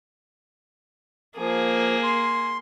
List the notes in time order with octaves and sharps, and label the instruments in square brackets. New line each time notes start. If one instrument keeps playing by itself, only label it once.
[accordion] F3 [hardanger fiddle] A#3 G#4
[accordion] C6